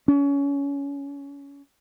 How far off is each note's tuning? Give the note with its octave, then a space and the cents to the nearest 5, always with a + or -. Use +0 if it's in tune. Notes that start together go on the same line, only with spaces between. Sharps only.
C#4 +25